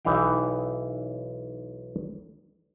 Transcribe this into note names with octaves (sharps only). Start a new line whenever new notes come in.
B1 E3 D#4 F5 G5